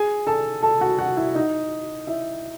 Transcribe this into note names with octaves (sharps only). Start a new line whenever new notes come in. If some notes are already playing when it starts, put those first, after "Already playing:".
Already playing: G#4 G#5
A4 A5
A4 A5
F#4 F#5
F#4 F#5
E4 E5
D#4 D#5
E4 E5